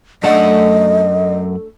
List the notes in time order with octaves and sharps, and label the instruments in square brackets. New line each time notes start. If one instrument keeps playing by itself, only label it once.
[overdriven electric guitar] F#2 F#5 [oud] A3 D4 A4 [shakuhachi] D#5